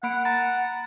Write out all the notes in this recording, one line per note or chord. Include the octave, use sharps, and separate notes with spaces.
A#3 F#5 B5 D7
A#5 B5 A6